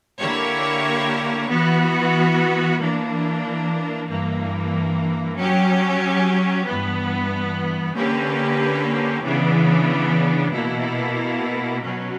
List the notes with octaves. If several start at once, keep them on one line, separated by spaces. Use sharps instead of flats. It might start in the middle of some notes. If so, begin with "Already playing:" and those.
D3 A#3 E4 G4 C#5
E3 B3 F#4
E3 A#3 D4
G2 E3 A#3
F#3 C#4 G4
G2 E3 B3
D3 A#3 C#4 G4 B4
C#3 E3 B3 D4
B2 A#3 E4
B2 F#3 C#4